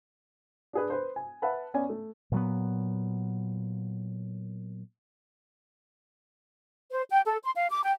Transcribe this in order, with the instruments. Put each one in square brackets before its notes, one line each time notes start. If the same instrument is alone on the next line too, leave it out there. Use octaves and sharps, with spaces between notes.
[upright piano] D4 G#4 B4
B4 C5
G#5
B4 E5 F#5 A5 B5
B3 C#4 D5 G#5
A3
[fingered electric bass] A#2 F#3 B3
[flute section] C5
G5
A4
C6
F5
D6
G5